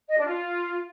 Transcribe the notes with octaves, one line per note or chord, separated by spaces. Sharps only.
D#5
D4
F4